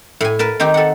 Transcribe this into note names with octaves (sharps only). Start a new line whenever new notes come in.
A2 G#5
A#4 B4 A5
D#3 C4 D#4 G4
A4 F#5